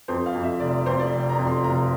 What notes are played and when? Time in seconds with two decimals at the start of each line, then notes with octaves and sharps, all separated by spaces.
0.08 F2 C5
0.26 F5
0.34 F2
0.44 E5
0.60 F1 D5
0.73 D5
0.86 F2 C5
0.99 D5
1.12 F1
1.29 A#5
1.38 F2
1.47 C6
1.64 F1 A#5